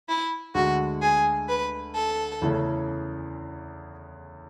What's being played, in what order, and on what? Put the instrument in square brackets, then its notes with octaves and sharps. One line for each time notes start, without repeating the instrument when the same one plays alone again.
[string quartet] E4
[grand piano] D2 D3 G#3 [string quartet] F#4
[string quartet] G#4
B4
A4
[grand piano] E2 C#3 E3 A3 C#4